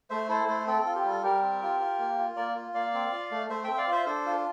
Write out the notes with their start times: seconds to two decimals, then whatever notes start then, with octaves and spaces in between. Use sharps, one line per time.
0.10 A3 C5 E5
0.29 E4 A4 C5
0.48 A3 A4 C5
0.67 C4 A4
0.81 A4
0.86 F4
0.95 G4
1.05 G3 A4
1.23 G3 G4 A#4
1.42 C4
1.62 F4
1.80 F4
1.99 A#3
2.18 F4
2.36 A#3 A#4 D5
2.56 F4
2.74 A#3 D5 F5
2.94 C4
3.12 F4
3.31 A3
3.50 A3 C5 E5
3.64 C4 E5 G5
3.74 G5
3.77 D5 F5
3.88 F4 C5 E5
4.06 D4 A4 C5
4.26 F4